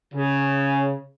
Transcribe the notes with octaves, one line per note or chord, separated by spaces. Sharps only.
C#3